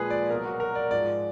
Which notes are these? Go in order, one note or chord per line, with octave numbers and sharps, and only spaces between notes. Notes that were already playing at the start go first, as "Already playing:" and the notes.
Already playing: A#2 F3 G#3 G#4 B4
D5
B2 F#3 A#4
F#4
A#4
D5
G#2 F3 G#3 D5